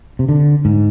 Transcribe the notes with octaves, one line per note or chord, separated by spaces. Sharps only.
C3
D3
G#2